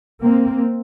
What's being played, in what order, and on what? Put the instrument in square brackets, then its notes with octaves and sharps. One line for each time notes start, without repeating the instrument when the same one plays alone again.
[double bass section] A#3 C4